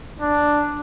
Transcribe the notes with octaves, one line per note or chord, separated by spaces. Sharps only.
D4